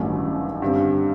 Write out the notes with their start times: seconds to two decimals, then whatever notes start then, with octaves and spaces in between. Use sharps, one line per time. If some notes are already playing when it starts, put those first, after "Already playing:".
Already playing: A1 G2 D#3 F#3 A3
0.62 G2 D3 G3 C4